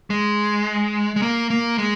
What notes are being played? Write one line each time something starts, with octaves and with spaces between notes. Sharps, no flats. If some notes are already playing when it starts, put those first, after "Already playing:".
G#3
G#3
A#3
A#3
G#3